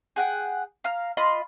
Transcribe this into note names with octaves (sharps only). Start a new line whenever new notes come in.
G#4 F#5 G5
F5 A#5 F6
F4 D#5 B5 C6